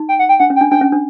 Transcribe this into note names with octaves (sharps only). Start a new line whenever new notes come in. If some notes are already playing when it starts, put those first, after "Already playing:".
Already playing: D#4
G5
F#5
G5
D4 F#5
C#4
G5
D4
D4 G5
C#4
D4